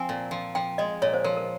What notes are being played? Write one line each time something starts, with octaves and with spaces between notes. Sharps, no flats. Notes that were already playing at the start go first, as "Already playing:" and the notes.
Already playing: F3 C4 G#5
A#2
F3
F3 G5
G#3 D#5
A#2 C#5
C5
F3 A#4
A#4